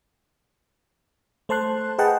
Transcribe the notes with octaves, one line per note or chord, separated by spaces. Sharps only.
A3 C5 A5 C6 F#6
G#4 B4 D#5 F#5 G5 A5